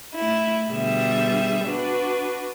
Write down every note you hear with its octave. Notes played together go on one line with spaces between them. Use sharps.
A3 E4
B2 D3 G3 G#4 E5
D4 F#4 B4